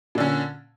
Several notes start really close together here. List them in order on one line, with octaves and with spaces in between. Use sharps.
A#2 D3 C#4